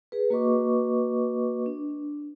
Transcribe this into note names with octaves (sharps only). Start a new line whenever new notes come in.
G#4 B4
A#3 F#4 B4 D#5 C#6 D6
D4